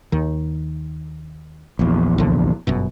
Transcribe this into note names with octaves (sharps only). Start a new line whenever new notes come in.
D#2 D#3
A#1 E2
C2 D3
G1 F#2 B2